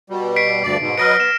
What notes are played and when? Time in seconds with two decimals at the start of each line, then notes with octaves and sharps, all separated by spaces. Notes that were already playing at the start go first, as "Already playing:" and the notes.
0.10 B2 G3
0.36 B6 C7 D7
0.63 D2 G2 D5
0.81 G#2 B2
0.98 F#3 B4 D#5 F6 A#6 D7
1.20 B3 E7